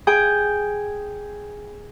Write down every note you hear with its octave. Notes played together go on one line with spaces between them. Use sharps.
G#4 G5